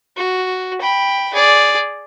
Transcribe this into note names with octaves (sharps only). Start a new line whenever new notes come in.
F#4
G5 B5
G#4 D5